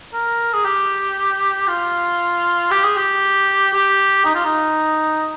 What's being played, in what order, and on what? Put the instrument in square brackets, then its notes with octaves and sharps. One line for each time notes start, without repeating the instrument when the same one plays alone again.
[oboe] A#4
G#4
G4
F4
G4
G#4
G4
G4
D#4
F4
D#4